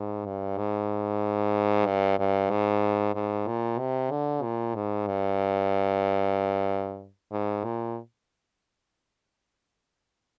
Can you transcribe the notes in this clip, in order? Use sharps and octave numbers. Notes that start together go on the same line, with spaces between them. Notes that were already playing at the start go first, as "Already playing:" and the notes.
Already playing: G#2
G2
G#2
G2
G2
G#2
G#2
A#2
C3
D3
A#2
G#2
G2
G#2
A#2